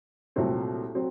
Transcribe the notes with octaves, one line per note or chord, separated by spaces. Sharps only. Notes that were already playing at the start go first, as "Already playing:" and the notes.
C2 A#2 F#3 A3 C4
F#3 C4